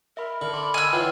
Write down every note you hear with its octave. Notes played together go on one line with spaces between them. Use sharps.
A#4 E5 B5
D3
B5 C6 D6
D#5 G#5 E6 F6 G#6
E3 F4 C#5 F#5 G5